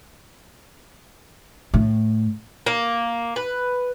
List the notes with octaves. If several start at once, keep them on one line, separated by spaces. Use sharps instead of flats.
A2
A#3
B4